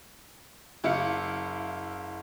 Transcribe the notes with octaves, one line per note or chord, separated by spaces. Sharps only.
F#1 E4 F5 C#7